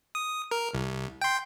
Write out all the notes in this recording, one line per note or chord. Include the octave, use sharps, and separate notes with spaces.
D#6
A#4
C2
G5 C6